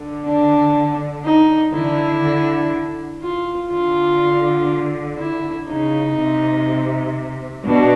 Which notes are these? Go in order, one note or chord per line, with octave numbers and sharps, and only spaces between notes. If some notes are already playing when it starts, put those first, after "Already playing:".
Already playing: D3
D4
D#4
D3 E4
D3
F4
D3 F4
E4
C#3 D#4
C3
B2 D4